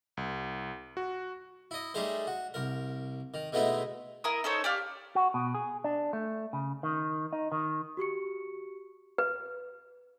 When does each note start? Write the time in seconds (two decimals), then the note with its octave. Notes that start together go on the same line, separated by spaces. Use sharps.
0.17 C2
0.97 F#4
1.71 E4 D#5
1.94 G3 A3 D#4 G#4 C5
2.27 F#4
2.54 C2 A#4
3.34 D#3
3.52 B2 G#3 A3 B3 D#4 E4
4.24 E4 A#4 D#6
4.44 D#4 A4 C5 C#5
4.64 G4 D5 F5
5.15 F#4
5.34 B2
5.55 G#4
5.84 D4
6.13 A3
6.53 C#3
6.83 D#3
7.33 D#4
7.52 D#3
7.97 F#4 G4 C#6 C#7
9.18 B4